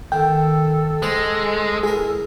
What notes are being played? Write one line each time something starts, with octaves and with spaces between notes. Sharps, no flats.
D#3 A4 G5
G#3 C5
E4 G#4 A#4